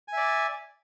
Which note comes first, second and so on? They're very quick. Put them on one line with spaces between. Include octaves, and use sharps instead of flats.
G#5 E5 D5